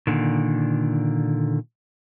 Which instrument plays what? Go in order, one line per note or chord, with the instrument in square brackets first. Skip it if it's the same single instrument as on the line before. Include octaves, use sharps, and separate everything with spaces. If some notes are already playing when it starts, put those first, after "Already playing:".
[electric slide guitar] A#2 D3 D#3